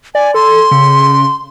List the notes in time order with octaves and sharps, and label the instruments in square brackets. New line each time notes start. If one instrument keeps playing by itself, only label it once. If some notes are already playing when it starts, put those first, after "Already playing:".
[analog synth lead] D5 [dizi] G#5
[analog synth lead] A4 [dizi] C6
[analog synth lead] C#3